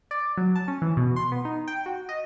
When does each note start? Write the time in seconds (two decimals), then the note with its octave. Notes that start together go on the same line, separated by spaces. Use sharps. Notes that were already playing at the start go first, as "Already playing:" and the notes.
0.11 D5
0.37 F#3
0.56 A5
0.68 C#4
0.82 E3
0.97 B2
1.16 C6
1.32 B3
1.45 D#4
1.68 G5
1.86 F#4
2.09 D#5